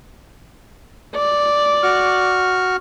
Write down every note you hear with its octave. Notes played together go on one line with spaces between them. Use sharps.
D5
F#4 C#6 F6